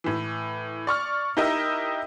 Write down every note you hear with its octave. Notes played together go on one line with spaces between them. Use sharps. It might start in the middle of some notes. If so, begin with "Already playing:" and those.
A2 E3
D5 C#6 F6
D#4 E4 G4 A#4 D#5 E5